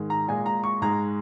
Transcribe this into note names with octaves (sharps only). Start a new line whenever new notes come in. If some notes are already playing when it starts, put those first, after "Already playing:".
Already playing: G#2 D#3 G#3
A#5
A#2 G#3 G#5
A#5
C#6
G#2 G#3 A#5